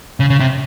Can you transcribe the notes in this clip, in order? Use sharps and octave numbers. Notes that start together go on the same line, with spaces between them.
C#3
C#3
C3